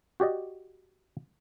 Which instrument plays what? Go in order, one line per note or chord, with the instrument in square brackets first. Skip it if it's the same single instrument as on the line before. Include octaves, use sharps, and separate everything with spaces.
[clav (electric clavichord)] F#4 G4 D5 D#5